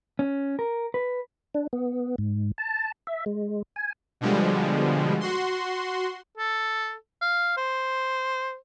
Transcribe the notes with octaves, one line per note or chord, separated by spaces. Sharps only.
C#4
A#4
B4
D4
B3
G#2
A5
E5
G#3
G#5
B2 D3 F3 G3 G#3
F#4 C6
A4
F5
C5